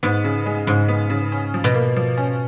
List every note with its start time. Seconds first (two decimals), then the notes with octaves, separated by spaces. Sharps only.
0.03 G#2 B3
0.24 C#3
0.46 G#3
0.67 G#2 C#3
0.88 B3
1.10 C#3
1.32 C#4
1.54 F3
1.64 B2
1.74 A#3
1.96 F3
2.18 C#4